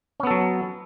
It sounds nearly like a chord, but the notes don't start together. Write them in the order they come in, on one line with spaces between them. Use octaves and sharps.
C#4 B3 A4 F#3